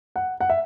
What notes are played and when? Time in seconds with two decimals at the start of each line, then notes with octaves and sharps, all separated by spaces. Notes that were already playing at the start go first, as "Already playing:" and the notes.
0.16 F#5
0.41 F#5
0.50 E5